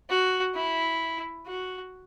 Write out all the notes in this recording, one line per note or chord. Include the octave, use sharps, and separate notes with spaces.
F#4
E4
F#4